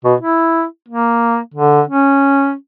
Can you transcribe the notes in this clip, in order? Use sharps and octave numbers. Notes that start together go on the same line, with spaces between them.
B2
E4
A#3
D3
C#4